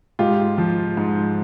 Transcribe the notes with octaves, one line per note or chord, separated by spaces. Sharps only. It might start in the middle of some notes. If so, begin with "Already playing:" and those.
G#2 F4 G4
F3
G#2